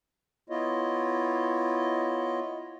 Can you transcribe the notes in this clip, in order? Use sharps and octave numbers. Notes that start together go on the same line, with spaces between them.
B3 E4 F4 C#5 D#5